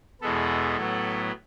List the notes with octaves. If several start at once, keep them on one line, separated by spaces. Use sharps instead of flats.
E2 B2 G#3 B3 A4
A2 F#3 B3